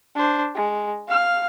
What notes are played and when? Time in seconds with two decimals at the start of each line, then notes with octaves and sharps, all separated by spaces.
0.15 D4 C5
0.55 G#3
1.08 F5 F6